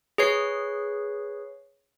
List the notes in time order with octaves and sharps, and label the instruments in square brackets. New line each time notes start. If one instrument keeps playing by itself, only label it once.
[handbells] G#4 B4 C#5 C7